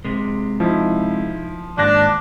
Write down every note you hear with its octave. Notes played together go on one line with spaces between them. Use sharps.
C3 G#3
F3 D#4 E4
D#2 G#2 D4 F#6 A#6